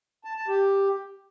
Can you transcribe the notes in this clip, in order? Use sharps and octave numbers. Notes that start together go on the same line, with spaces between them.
A5
A5
G4